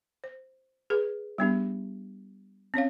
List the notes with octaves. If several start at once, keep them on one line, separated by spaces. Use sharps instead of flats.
C5
G#4 B4
G3 B3 D4 G4
C4 C#4 C#5 F5